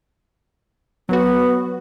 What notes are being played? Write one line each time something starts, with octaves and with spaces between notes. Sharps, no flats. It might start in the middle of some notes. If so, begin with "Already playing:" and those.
F#3 B3 F#4